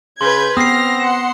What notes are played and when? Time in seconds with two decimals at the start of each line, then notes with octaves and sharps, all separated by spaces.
0.21 C#3 B4 C6 G6 G#6
0.57 B3 C4 D#6 F6 A#6 C7
1.00 F#5 C6 E7